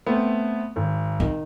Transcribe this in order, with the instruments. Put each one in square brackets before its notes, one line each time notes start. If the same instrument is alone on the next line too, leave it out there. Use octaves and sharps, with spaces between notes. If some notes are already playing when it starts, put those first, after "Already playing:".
[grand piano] A3 B3 C4
G#1
[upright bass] D#3